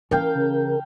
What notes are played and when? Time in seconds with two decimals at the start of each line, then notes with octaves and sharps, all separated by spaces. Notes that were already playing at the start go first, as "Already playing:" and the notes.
0.11 E3 C#4 A#4 F5 G5 A5
0.35 C#3